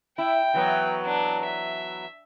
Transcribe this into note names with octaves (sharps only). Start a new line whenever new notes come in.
E4 G5
E3 F#3 B3
D4
E5